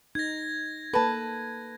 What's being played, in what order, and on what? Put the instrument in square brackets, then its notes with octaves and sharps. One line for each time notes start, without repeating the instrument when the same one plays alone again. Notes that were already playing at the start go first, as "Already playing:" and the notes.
[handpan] D#4 [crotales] G#6 A#6
[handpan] A#3 A4 [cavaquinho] B4 A5